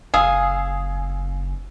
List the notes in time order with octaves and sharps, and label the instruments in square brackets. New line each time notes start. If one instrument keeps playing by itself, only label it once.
[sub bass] F#1 [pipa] G#4 [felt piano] F5 E6